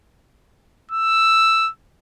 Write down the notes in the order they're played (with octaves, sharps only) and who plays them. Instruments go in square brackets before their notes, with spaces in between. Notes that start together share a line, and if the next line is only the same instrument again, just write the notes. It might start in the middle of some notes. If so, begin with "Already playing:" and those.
[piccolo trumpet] E6